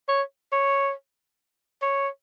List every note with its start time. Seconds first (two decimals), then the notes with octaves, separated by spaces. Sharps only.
0.09 C#5
0.53 C#5
1.82 C#5